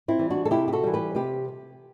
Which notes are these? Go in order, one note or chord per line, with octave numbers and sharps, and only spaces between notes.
C4 E4
E3 G3
D4 F#4
A4
C3 E4 G4
G4
F#4 A4
E3 G3
G4 B4
C3 G4 B4